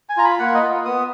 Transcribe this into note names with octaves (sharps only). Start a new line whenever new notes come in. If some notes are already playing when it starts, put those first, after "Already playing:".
G#5
F4 A#5
B5
A#3 F#5
D#5
F4
B3 D#6